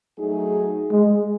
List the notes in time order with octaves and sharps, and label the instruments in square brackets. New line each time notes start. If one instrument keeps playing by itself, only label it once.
[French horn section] F#3 A3 D#4 G#4
[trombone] G#3